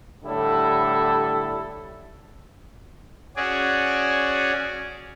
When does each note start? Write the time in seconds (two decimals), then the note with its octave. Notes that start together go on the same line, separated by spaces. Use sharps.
0.24 A2 D3 G3 E4 A4
3.36 C#4 F#4 G#4 D5